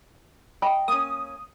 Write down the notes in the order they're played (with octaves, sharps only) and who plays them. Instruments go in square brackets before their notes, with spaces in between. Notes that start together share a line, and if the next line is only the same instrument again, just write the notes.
[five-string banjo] D#5 G5 B5
[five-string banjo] A#3 C#4 [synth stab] D#6